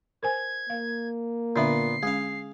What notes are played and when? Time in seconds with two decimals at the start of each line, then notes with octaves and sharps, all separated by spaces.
0.23 A#4 C5 G#5 G#6
0.70 A#3 F5
1.56 A#2 D3 B3 D4 E5 C7
2.03 G#3 C#4 G#4 F5